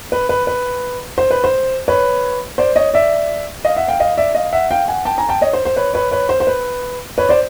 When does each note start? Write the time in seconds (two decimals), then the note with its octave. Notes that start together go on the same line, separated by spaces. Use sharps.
0.12 B4
0.29 B4
0.47 B4
1.18 C5
1.31 B4
1.44 C5
1.88 B4 C#5
2.58 C5 D5
2.76 C#5 D#5
2.94 D5 E5
3.65 D#5 F5
3.76 E5 F#5
3.88 F5 G5
4.00 D#5 F5
4.17 D5 E5
4.35 D#5 F5
4.53 E5 F#5
4.71 F5 G5
4.88 F#5 G#5
5.05 G5 A5
5.18 G#5 A#5
5.29 G5 A5
5.41 C#5 D#5
5.53 C5
5.65 C5
5.76 B4 C#5
5.94 B4 C#5
6.11 B4 C#5
6.29 C5
6.40 C5
6.47 B4
7.18 B4 C#5
7.29 C5 D5